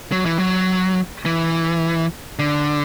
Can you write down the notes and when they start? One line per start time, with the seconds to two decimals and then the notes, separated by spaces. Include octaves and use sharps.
0.12 F#3
0.26 E3
0.38 F#3
1.26 E3
2.39 D3